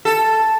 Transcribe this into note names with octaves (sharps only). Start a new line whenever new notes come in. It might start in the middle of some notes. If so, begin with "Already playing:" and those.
A4